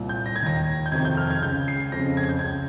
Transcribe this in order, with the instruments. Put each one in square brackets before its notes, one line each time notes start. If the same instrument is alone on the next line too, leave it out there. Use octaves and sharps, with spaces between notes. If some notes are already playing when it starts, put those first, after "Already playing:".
Already playing: [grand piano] C2 A#2
G6
A#6
G#6
D#2 D#3 A#6
G6
F2 C3 D#3 G#6
G6
F6
G#6
C#2 C#3 G6
C7
F2 C#3 A#6
G#6
G6
C#2 C#3 G#6